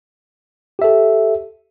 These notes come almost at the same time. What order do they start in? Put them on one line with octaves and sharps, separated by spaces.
G4 E5 A4